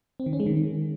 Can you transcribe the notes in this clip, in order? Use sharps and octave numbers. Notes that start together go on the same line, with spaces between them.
C4
D#3
C#4
G#3
D#3